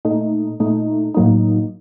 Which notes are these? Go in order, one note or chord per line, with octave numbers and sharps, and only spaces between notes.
A#2 A3 D#4
A#2 A3 D#4
A2 F#3 A#3 D#4